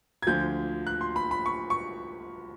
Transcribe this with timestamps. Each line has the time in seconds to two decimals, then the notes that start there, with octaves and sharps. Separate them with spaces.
0.22 G#6
0.27 D2 D3 F3 G6
0.87 F#6
1.01 C6
1.16 B5
1.31 B5
1.46 C#6
1.70 C#6